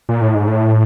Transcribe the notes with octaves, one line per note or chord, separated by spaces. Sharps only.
A#2
A2
G#2
A2